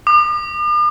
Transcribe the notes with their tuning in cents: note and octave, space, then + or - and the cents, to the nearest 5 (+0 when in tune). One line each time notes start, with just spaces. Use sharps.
D6 +45